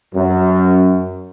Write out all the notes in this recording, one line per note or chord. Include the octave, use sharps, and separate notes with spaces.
F#2